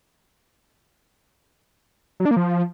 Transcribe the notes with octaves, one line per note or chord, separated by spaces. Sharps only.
F#3
D4
A#3
F3